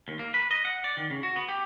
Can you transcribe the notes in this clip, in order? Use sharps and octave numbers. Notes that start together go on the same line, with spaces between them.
D#2
A#3
B4
D#5
F#5
D5
D#3
C#3
F#4
B3
G4